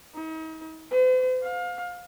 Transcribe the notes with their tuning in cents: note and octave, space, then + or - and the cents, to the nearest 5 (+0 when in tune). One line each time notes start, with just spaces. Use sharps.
D#4 +40
C5 -45
F5 +30